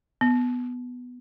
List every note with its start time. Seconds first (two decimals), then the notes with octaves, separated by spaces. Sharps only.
0.21 B3